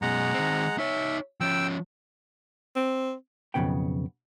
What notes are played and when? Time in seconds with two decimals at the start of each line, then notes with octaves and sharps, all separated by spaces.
0.02 F#2 B2 G#3 F#5 A#5
0.34 D#3 C4
0.78 D#4 C#5 E5
1.41 F3 C#4 G5 E6
2.76 C4
3.54 B1 F2 A#2 C#3 B3 G5